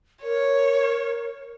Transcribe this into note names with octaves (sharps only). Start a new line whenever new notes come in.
A#4 C#5